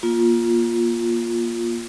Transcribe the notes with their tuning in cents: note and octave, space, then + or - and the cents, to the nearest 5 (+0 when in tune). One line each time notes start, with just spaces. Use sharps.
A#3 +25 F4 +0